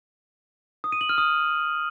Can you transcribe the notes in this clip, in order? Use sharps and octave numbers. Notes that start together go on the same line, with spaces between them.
D#6
D#7
F#7
F6
D#6